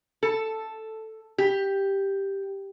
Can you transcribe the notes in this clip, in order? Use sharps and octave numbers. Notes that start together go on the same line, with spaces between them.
A4
G4